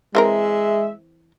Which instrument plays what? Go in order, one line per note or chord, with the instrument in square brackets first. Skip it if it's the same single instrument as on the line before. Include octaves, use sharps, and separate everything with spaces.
[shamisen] E3 C4 A#4 [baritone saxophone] G#3 [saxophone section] E5